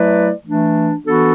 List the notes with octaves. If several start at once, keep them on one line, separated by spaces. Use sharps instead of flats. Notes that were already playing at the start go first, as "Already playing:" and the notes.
Already playing: F#3 A3 E4 B4 D5
E3 A3 D4
E3 B3 D4 F#4 A4